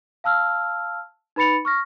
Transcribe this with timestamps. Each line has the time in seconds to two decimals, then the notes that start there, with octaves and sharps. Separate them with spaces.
0.24 F5 A5 E6 F6
1.36 D#4 B4 B5 A6 C#7 F7
1.65 C#6 F6 A#6